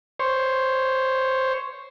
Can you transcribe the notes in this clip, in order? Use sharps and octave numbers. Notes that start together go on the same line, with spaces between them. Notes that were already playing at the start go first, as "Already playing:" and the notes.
C5 C#5